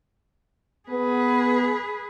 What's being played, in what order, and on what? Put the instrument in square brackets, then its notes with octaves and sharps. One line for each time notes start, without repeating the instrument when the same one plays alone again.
[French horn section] B3 [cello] G#4 B4